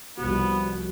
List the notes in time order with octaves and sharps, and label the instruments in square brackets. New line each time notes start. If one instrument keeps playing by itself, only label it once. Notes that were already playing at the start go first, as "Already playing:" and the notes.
[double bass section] C2 F3 [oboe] B3 [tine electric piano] F#4